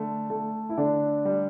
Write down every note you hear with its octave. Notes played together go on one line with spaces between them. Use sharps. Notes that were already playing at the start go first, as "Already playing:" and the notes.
Already playing: D3 A3
A3
E4
D3 D4
G3